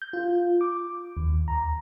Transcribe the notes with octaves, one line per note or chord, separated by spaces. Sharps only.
G6
F4
D6
D#2
A#5